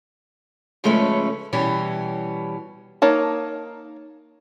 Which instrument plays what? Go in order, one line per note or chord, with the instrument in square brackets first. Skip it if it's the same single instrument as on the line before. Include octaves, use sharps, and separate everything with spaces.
[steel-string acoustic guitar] C#3 F3 G#3 A3 C#4 B4
B2 E3 G3 C#4
[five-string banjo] A#3 D#4 C#5 A5